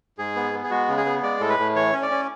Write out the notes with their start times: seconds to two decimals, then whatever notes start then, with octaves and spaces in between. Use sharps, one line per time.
0.18 G#2 G#4
0.36 B3
0.53 B3
0.64 G#4
0.71 G#3 F#4
0.88 C#3
0.97 G#4
1.05 B3
1.23 G#3 D5
1.41 A2 A4
1.49 B4
1.59 A2
1.75 E3 C#5
1.93 C#4
2.02 D5
2.10 C#4